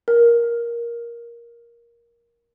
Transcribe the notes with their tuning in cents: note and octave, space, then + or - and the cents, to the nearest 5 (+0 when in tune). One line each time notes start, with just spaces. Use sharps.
A#4 +10